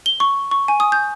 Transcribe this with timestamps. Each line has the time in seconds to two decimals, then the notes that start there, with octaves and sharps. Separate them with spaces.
0.06 G7
0.20 C#6
0.51 C#6
0.68 G#5
0.80 D#6
0.92 G6